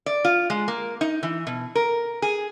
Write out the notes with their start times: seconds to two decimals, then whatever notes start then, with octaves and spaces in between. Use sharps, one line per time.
0.06 D5
0.25 F4
0.50 G#3
0.68 A#3
1.01 D#4
1.23 E3
1.47 B2
1.75 A#4
2.22 G#4